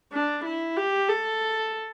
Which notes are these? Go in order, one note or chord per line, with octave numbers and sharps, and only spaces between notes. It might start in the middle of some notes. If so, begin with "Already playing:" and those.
D4
E4
G4
A4